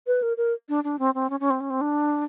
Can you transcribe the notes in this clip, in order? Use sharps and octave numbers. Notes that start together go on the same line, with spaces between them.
B4
A#4
A#4
D4
D4
C4
C4
C#4
C#4
C4
C#4
C4
D4